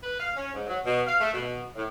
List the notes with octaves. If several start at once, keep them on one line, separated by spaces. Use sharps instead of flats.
B4
F5
C#4
G#2
F#3
B2
F5
A3
B2
A2